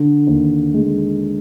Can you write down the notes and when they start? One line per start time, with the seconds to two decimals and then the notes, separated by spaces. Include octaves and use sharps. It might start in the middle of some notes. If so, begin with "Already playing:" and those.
Already playing: D3
0.27 D#2
0.74 G#3